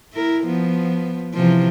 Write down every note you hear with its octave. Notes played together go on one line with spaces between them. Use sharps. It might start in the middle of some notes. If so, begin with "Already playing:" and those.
E4 A#4
F3 B3
C3 E3 F3